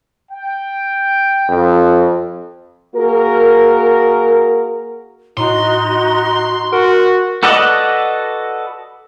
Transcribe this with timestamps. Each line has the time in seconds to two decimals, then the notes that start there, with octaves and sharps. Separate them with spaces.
0.30 G5
1.49 F2
2.95 A#3 F#4 G#4 A#4
5.37 A2 D#4 F#4 A#5 C6
6.73 F#4 A#4
7.43 F#4 A4 B4 D5 D#5